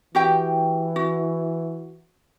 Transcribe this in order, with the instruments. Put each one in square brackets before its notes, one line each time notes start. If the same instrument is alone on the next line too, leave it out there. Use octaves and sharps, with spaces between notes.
[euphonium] E3 [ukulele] F#4 G4 G5
[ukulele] F#4